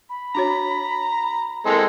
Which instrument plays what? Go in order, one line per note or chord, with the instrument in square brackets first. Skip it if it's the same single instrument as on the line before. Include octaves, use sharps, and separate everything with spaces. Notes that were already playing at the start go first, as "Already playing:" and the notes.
[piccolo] B5
[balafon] D4 F#4 C#5 [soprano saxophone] A#5
[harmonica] G#3 C4 A4 [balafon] E4 A#4 [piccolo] C6